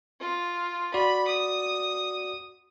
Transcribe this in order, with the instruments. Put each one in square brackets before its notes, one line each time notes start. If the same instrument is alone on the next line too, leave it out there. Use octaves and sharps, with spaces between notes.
[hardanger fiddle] F4
[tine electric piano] F#4 D5 [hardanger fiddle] B5
[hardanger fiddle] D#6